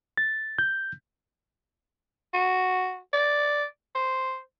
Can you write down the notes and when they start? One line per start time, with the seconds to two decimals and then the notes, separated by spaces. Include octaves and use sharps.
0.18 A6
0.59 G6
2.34 F#4
3.13 D5
3.95 C5